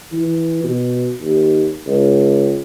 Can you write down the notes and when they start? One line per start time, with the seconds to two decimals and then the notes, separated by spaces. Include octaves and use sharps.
0.13 E3
0.64 B2
1.21 D#2
1.86 C#2